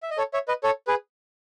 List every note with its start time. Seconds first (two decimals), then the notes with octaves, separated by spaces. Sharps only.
0.03 E5
0.10 D#5
0.18 A4 C#5
0.33 C#5 E5
0.48 B4 D#5
0.63 A4 C#5
0.87 G#4 B4